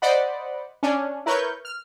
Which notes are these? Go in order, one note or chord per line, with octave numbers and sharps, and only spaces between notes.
C5 D5 D#5 F#5 B5
C#4 D4
E4 A#4 B4 C#5 C#6 G6
F6